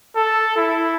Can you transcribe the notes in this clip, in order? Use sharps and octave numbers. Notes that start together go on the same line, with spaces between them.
A4
E4